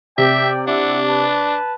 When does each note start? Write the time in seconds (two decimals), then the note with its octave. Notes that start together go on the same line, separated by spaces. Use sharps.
0.18 C3 D5 E5 G5
0.67 D4 E4 E5 F#5
1.09 B4 A5